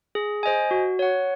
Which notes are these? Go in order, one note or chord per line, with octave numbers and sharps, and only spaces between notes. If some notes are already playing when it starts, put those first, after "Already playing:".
G#4
C5 D#5 G#5
F#4
C#5 F#5